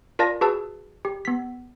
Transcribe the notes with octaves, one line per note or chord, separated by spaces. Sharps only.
F4 A#4 D5 A5 A#6
F#4 G#4 B4 A5 E6
G4
B3 B6